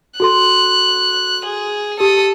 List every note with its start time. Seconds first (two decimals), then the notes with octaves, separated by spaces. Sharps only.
0.20 F#4 A4 C6 F#6
1.46 G#4
2.00 G4 A4 D#6